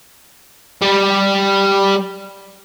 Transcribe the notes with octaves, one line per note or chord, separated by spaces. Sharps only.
G3 G4